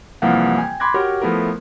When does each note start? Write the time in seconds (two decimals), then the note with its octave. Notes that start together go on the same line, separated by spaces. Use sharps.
0.22 C2 E3 F3 A#3 F5 F#5
0.58 G5 G#5
0.80 B5 C6 D6 F#6 G#6 A#6
0.94 F#4 G4 A#4 C#5 F#5
1.22 F3 A3 B3 E4 A#4